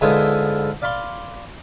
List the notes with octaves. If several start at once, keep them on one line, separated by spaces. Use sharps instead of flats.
G#2 D3 B3 E4 F4 D#6
D5 F5 B5 C6